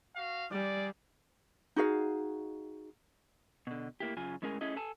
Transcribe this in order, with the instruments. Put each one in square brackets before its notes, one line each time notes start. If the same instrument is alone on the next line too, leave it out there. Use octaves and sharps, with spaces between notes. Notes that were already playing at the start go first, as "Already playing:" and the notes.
[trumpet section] F#4 F5
[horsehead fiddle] G3 [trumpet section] G#4 D5
[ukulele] D#4 F#4 G#4 F5
[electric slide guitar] B2 D3
A2 A#3 E4 G4
F#2 C#3 F4 G#5
A2 G#3 C#4 G#4 A#4 G#5
A3 C#4 E4 G#4 D#5
A4 G#5 A5